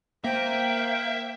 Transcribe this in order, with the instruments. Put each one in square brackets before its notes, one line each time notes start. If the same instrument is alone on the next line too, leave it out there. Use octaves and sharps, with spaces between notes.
[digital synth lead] A#3 [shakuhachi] C5 [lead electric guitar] E5 [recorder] G5